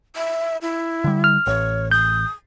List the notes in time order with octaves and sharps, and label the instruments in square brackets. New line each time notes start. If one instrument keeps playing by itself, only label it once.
[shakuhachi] E5
E4
[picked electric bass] D3 G3
[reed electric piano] F6
[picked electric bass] A1 [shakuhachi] C#5
[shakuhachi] D#6 [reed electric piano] G6